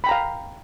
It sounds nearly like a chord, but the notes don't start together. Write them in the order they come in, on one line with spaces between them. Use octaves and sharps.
B5 G5 A#5 F5